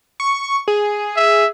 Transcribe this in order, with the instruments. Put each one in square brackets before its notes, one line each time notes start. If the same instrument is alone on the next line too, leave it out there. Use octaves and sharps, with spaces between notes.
[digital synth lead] C#6
G#4
[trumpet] E5